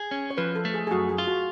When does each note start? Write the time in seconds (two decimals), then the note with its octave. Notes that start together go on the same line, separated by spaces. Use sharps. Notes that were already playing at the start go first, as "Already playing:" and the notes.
Already playing: G#4
0.11 C#4
0.31 C#5
0.37 F3 B4
0.56 A4
0.65 A3
0.74 G#4
0.87 G#4
0.91 F#2 F#4
1.09 G#4
1.18 F4
1.27 F#4